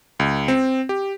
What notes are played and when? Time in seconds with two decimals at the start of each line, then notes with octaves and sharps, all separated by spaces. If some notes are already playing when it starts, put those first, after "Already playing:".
0.19 C#2
0.48 C4
0.89 G4